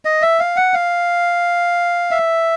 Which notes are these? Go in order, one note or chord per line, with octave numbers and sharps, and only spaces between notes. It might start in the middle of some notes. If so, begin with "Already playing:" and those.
D#5
E5
F5
F#5
F5
E5